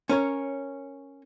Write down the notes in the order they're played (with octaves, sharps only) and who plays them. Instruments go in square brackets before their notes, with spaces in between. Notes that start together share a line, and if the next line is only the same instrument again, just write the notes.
[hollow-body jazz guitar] C#4 A#4 C#5